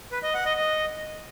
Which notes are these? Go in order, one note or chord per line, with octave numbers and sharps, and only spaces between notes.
B4
D#5
F#5
D#5
D#5